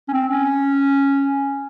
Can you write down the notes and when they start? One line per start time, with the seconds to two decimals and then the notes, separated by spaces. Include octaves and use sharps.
0.08 C#4
0.13 C4
0.31 C#4